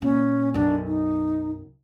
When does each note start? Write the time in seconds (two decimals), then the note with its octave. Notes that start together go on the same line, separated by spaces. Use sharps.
0.02 A#2 C#4
0.54 B1 F#2 D4
0.87 D#4